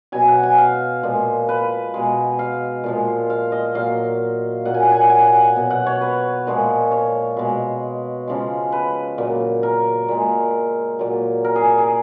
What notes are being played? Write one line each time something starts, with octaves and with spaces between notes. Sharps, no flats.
B2 F#3 G#5
F#5
G#5
F5
A#2 F3 G#3
B4
B2 G#3
F5
A#2 F3 G#3
F5
D#5
A#2 F#3 F5
A#2 F#3 F#5
G#5
F#5
G#5
F#5
G#5
F#5
G#5
F#5
B2 F#3
F#5
C#5
B4
A#2 F3 G#3
C#5
B2 G#3
C#3 F3 G#3
B4
A#2 F#3
A#4
A#2 G#3
A#2 F#3
A#4
G#4
G#4